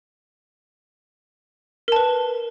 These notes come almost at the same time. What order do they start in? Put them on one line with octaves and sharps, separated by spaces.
A#4 A5 B4